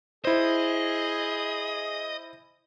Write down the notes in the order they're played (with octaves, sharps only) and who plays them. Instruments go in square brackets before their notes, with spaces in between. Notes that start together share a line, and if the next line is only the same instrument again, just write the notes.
[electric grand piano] E4 C5 [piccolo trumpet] G#4 [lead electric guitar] D#5